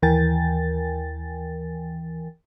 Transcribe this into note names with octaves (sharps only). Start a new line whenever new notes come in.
D#2 E3 A#4 G5 G#5 A6